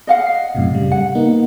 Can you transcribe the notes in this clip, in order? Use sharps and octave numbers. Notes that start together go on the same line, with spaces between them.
D#5 F5 F#5
C7
F#2 A2 C3
C#3 G3
F#5
A#3 B3 D#4